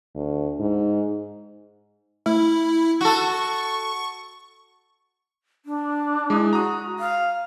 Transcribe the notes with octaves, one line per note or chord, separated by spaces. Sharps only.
D2
G#2
A3 E4
F#4 A4 C#6
D4
G#3 E4 D#6
F#4 A#5 D#6
F5